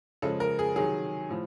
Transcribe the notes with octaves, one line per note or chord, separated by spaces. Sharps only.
C#3 F3 G#3 A4
A#4
G#4
C3 D#3 F#3 G#4
A2 F3